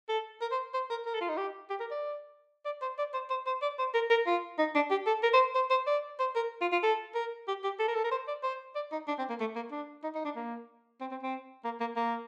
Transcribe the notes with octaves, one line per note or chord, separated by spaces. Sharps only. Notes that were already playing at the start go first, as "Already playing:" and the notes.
A4
A#4
C5
C5
A#4
A#4
A4
F4
D#4
G4
G4
A#4
D5
D5
C5
D5
C5
C5
C5
D5
C5
A#4
A#4
F4
D#4
D4
G4
A4
A#4
C5
C5
C5
D5
C5
A#4
F4
F4
A4
A#4
G4
G4
A4
A#4
A4
A#4
C5
D5
C5
D5
D#4
D4
C4
A#3
A3
A#3
D4
D#4
D#4
D4
A#3
C4
C4
C4
A#3
A#3
A#3